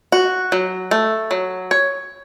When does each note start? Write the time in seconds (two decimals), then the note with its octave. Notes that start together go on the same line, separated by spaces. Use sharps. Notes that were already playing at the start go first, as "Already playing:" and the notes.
0.12 F#4
0.52 F#3
0.91 A3
1.31 F#3
1.71 C#5